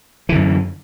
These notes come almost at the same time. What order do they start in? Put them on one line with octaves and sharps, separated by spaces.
E3 D3 F#2